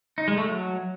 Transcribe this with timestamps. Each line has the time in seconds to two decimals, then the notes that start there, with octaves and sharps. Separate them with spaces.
0.18 D#4
0.28 G#3
0.38 A3
0.48 F#3